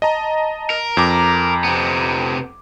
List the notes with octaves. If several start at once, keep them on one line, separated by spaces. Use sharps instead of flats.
D#5 A5 A#5
A#4
F2 A#5 D6
C3 B3